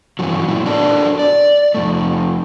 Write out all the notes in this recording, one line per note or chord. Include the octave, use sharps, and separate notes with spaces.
G2 E3 F#3
A#2 E4
D4 F#4 A4 A#4 D5
D5
F2 G#2 A3